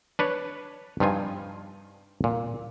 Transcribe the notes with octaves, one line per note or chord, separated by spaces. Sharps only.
D4 B4 C#5
G2 F3 D#4 F4 G#5
A#2